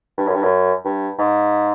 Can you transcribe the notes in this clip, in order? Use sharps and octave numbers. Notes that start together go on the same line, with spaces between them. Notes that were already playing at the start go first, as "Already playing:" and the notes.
G2
F#2
G2
F#2
G2
G#2